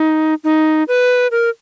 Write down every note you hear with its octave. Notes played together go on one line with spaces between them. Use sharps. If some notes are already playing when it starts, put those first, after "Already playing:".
Already playing: D#4
D#4
B4
A#4